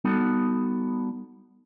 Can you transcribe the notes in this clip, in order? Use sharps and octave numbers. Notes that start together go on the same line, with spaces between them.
G3 B3 D#4 F#4 A4